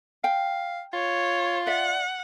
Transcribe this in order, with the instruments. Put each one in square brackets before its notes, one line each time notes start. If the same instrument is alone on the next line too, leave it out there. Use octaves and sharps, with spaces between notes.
[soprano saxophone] F5 [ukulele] G5
[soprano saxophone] F4 [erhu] C#5
[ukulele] D5 E5 [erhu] F#5